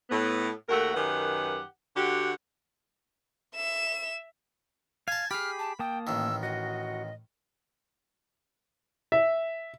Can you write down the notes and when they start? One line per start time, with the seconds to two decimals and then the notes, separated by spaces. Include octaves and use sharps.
0.10 A2 B3
0.69 D#2 A3 F#4 A#4 F#5
0.95 F#2 D#3 G4 B4 F#5
1.96 D3 F#4 G4
3.55 E5 E7
5.08 F5 G#5 A5 G#6
5.31 G4 G#4 B5 F6
5.59 A5
5.79 A#3 G5 A5 D#6
6.07 A1 D#3 E6
6.43 F#4 D#5
9.12 E5